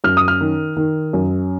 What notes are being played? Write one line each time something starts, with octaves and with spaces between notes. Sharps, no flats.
F#2 F6
D#6
F6
D#3
D#3
F#2